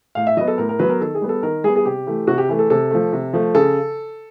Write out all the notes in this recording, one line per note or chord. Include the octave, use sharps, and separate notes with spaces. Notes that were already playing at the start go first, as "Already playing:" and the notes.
A2 F5
E5
F#3 B3 D#5
A4
A2 A#4
A#4
F#3 B3 B4
A#4
D#3 A4
G#4
G3 B3
A4
D#3 A#4
G3 B3 G#4
G#4
C3 G4
E3 A3
C3 F#4
G4
E3 A3
A4
C3 A4
F3 A3
C3
F3 A3
C#3 A4